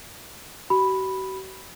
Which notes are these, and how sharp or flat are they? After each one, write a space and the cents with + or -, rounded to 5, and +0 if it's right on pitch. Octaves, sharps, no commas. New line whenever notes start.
F#4 +45 B5 +0